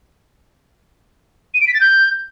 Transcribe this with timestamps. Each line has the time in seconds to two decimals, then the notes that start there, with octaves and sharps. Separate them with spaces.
1.54 D#7
1.61 D7
1.67 B6
1.74 A6
1.81 G6